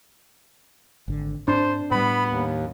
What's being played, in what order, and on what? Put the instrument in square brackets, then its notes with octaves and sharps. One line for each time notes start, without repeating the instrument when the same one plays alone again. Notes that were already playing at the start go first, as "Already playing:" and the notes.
[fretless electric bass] G#1 D3
[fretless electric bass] G#2 C4 [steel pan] D4 [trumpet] C5
[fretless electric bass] A2 G3 [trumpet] B3 [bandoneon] B5
[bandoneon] D#2